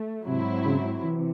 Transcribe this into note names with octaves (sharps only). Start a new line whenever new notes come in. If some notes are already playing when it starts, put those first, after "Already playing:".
Already playing: A3
G#2 C3 F#3 C4 E4
C#3
C3 E3